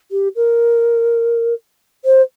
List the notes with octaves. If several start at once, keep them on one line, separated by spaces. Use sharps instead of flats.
G4
A#4
C5